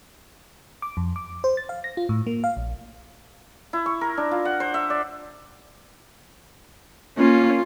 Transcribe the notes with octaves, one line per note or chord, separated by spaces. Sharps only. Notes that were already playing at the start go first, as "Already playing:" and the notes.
D6
F2
D6
C5
A6
F5
A#6
F4
A2
A#3
F5
A#1
E4
C#6
A#4
D4
F4
F#5
C5
E5
D5
A#3 C#4 F4